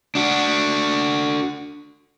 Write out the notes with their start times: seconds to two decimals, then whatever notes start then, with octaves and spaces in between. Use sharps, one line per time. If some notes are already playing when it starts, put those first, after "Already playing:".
0.15 D4 F#4